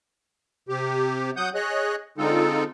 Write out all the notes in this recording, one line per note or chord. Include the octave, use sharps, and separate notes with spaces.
C3 G4
F#3 F#5 D#6 G6
G#4 C#5 D#5 F#6
D3 G#3 C4 D#4 F4 A4